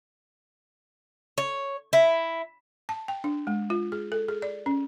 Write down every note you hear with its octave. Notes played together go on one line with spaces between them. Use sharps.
C#5
E4
A5
G5
D4
G#3
F4
G#4
A4
G#4
D5
C#4